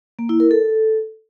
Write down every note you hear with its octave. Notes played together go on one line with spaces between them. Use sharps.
A#3
E4
A#4
A4